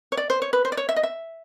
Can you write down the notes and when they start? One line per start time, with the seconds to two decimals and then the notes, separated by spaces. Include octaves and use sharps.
0.12 C#5
0.17 D5
0.30 C5
0.42 C#5
0.53 B4
0.65 C5
0.72 D5
0.77 C#5
0.89 E5
0.96 D#5
1.03 E5